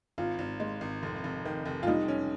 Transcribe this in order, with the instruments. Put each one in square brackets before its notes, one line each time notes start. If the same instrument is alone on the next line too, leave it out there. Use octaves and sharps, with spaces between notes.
[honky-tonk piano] G#1 [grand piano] F4
[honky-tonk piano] G#1
G#3
G#1
F1
F1
D#3
F1
[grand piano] F4
[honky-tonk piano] G3 [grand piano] D#4
[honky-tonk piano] C#4